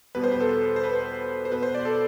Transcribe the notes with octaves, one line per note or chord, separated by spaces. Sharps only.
E2 B2 G3 B3 B4
C5
B4
A4
C5
B4
C5
B2 B3 B4
C5
D5
A4